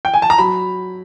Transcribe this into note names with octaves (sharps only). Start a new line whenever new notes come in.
G5
G#5
A5
A#5
F#3 B5